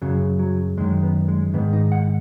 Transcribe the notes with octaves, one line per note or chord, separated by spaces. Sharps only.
F#2 C#3 F#3
F#3
F#2 D#3 G#3
B3
G#3
G#2 D#3 B3
D#4
F#5